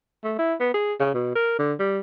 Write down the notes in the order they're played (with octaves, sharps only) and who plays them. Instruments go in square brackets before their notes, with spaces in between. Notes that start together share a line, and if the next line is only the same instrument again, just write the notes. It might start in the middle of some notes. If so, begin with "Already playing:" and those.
[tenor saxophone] A3
E4
B3
G#4
C#3
B2
A#4
D3
G3